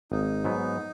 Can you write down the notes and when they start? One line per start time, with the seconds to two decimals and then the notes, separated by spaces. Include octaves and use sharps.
0.12 G#1 D#4
0.44 G#2 F#3 B3